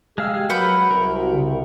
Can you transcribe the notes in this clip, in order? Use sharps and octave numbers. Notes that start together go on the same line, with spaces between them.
G#3 G4 F5 E6 F6
F#3 F#4 A#4 B4 F#5 B5 G6
C2 A#4
C#3